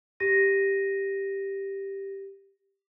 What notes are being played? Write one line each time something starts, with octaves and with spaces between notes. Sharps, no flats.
G4 A#6 D#7